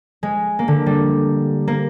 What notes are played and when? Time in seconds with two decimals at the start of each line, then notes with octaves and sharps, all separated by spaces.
0.23 G#3
0.59 A#3
0.68 D3
0.86 G3
1.68 A#3